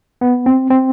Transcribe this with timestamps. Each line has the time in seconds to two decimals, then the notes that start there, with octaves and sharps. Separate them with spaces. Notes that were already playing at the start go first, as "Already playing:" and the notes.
0.21 B3
0.46 C4
0.70 C4